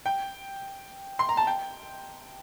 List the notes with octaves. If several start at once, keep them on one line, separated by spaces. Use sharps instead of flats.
G5
C6
A#5
A5
G5